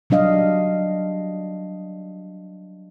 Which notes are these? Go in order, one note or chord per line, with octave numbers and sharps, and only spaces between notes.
F#3 G3 D4 D#5 F5